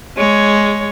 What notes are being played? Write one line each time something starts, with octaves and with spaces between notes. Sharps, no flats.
G#3 C#5